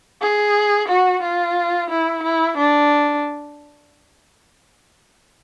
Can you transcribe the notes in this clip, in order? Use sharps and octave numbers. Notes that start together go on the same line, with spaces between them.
G#4
F#4
F4
E4
E4
D4